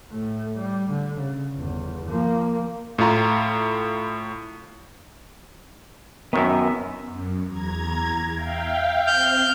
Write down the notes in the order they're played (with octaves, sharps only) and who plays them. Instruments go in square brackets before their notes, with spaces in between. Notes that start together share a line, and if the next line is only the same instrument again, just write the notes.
[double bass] A2 A3
G3
D3
C#3
G1 E2
F3 A#3
[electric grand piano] A2 E4 F4 A#5 C6
[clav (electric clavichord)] F#2 D#3 [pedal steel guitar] B3 E5
[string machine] F#2
E2 A#5 G#6
E5 F5 G5
[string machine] C4 [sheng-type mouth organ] F6 G6